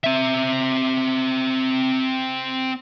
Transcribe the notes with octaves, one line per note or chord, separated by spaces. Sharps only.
C4 E5